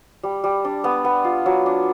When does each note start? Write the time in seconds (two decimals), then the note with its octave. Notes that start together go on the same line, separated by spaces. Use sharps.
0.23 G3
0.44 G3
0.65 D4
0.84 B3
1.05 B3
1.24 F4
1.46 F#3
1.66 D4